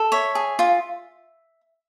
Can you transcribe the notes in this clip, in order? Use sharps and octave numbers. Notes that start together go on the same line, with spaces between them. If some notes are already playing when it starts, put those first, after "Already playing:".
Already playing: A4
C#5 E5
G#4
F4